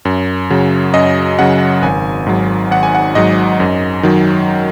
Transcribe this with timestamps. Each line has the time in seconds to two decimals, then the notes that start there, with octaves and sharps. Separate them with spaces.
0.05 F#2
0.50 C#3 F#3
0.94 F#2 D#5
1.39 C#3 F#3 F#5
1.82 G#1 G#5
2.27 G#2 F#3
2.71 G#1 F#5
2.83 G#5
2.95 F#5
3.15 G#2 F#3 D#5
3.60 F#2
4.03 D#3 F#3